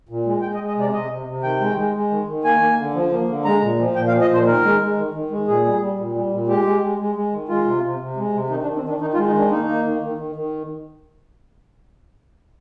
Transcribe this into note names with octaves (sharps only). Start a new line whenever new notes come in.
A#2
G#3
G#3 G5
D#5
G#3
D#5
C3 D5
C3 D#5
C3
C3
D#3 G5
G#3
G#3
G#3
D#3
D#3
A#3 G#5
A#3
D3
F3
A#3
D3
G#3 A#5
A#2
F3
A#2 G5
F5
F3
D#5
A#2 C5
D#3 A#4
G#3
G#3
D#3
D#3
G#3
A#2 G#4
G3
G3
A#2
G3
A#2
G#3 G4
G#3
G#3
G#3
G#3
D#3
G#3 F4
C3
C3
C3
G#3
C3
D#3 D#4
D4
D#3
C4
D#3 D4
D#3 D#4
F4
G#3
D#4
D#3 D4
A#3 D#4
A#3
D#3
D#3
D#3
D#3